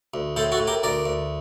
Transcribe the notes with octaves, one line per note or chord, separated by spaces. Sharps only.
D2
A2 A4 C5
F#4 A4
A2
G4 A#4
D2 A#4 D5
D2